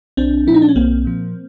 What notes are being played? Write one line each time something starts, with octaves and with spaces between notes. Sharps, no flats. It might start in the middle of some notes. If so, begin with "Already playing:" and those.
B1 C4 D4
A#2 F3 D#4 E4
D4
C#4
B1 A#3 C4
A#2 F3